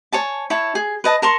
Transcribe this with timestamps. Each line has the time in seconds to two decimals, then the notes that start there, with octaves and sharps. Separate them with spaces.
0.12 C#5 G#5 A5
0.50 E4 C#5 A5
0.75 G#4
1.04 B4 D#5 A5
1.22 A#4 A5 C6 C#6